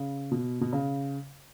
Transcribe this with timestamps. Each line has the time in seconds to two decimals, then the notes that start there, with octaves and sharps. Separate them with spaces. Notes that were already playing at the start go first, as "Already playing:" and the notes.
Already playing: C#3
0.31 B2
0.61 B2
0.73 C#3